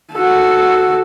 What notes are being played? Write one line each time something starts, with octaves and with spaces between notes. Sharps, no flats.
F#4 A4